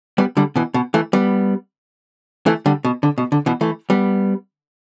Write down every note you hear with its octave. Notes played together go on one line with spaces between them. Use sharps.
G3 B3
D3 G3
B2 E3
B2
E3 A3
G3 B3
E3 A3
D3 G3
B2
D3
B2
D3
B2 E3
E3 A3
G3 B3